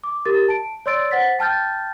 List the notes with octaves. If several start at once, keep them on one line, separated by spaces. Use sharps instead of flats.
D6
G4 A#4 A6
A5 D7
C#5 D5 C6 E6 A6 D7
C5 F#5 A6 B6
G5 A5 F6 G6 A6